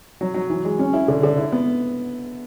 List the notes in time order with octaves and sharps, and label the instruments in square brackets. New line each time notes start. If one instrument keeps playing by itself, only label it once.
[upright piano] F#3
F#3
E3
G#3
C#4
E4
D3
D3
E4
B3